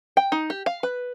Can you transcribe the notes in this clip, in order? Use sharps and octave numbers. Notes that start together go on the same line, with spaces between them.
G5
D#4
G4
F5
B4